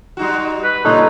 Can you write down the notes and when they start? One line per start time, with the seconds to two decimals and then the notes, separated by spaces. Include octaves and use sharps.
0.17 G3 D#4 F#4
0.64 B4
0.85 A#2 C#3 G3 D#4 A4 C#5